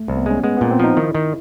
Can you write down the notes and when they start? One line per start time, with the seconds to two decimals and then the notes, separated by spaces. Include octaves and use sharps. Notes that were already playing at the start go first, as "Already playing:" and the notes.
Already playing: A3
0.08 C2
0.17 B3
0.26 G#3 C#4
0.44 G#3 B3
0.57 A#2 B3
0.71 C4
0.79 F3 D#4
0.97 D#3 E4
1.15 D#3